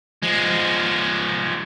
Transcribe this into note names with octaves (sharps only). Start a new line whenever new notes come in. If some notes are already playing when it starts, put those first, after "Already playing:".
F3 G#3